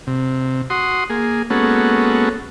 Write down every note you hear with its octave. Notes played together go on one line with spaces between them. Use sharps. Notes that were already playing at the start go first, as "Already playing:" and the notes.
C3
F#4 C6 D#6
A#3 G#4
G#3 A#3 B3 C#4 F#4 A4